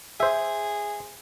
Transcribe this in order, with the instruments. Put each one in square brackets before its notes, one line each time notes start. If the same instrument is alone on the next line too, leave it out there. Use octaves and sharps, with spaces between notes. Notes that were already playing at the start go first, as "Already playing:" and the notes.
[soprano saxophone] G#4 [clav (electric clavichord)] C5 E5